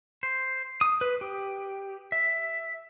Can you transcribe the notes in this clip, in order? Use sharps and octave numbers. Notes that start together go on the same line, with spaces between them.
C5
D#6
B4
G4
E5